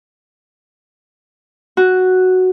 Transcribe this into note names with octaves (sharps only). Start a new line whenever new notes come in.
F#4